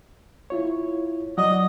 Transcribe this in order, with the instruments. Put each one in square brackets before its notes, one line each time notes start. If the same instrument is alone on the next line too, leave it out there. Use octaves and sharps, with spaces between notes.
[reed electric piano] E4 F4 C#5
[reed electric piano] F#3 D5 F#5 [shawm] D#5